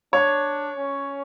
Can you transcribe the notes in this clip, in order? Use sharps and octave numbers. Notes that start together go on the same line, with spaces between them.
D4 C#5
C#4